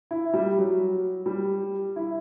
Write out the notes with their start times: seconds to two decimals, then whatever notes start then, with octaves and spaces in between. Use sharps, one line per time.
0.11 E4
0.34 G3
0.57 F#3
1.26 G3
1.96 E4